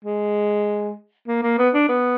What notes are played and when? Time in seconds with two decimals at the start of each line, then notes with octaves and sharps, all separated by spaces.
0.05 G#3
1.27 A#3
1.43 A#3
1.58 B3
1.74 D4
1.89 B3